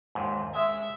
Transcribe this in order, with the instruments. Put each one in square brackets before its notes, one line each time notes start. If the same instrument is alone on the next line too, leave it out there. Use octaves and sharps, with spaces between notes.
[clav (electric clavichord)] D#2 G#2
[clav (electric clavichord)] G#3 [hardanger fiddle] E5